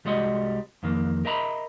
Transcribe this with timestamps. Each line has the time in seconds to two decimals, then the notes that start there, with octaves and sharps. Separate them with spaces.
0.05 C2 G3 G#3 F#4 D#5
0.83 F2 D#3 A#3
1.25 A#4 D#5 E5 A#5 B5